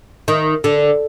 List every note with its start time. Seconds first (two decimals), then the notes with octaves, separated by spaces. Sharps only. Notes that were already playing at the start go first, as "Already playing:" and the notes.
0.28 D#3
0.64 D3